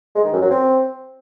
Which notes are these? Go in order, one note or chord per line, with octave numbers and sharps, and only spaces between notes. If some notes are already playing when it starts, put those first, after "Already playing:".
G#3
D#3
F#2
F#3
C4